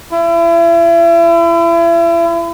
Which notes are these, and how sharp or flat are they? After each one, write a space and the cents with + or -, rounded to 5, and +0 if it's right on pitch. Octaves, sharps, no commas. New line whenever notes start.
E4 +35